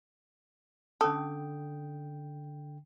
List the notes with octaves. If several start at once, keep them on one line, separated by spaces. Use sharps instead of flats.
D3 C#4 A4 G5 D#6